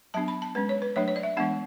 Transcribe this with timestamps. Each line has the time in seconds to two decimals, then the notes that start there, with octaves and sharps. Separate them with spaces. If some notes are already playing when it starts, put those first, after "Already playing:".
0.14 F#3 B3 D4 A5
0.28 B5
0.42 A5
0.55 G#3 C#4 B4
0.69 C#5
0.82 B4
0.96 F#3 A3 D4 C#5
1.08 C#5
1.16 D5
1.23 E5
1.37 E3 G#3 B3 D4 F#5